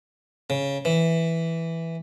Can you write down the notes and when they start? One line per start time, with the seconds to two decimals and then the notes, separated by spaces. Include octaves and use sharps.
0.50 C#3
0.85 E3